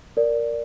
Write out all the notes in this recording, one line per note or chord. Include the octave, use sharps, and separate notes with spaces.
A#4 D5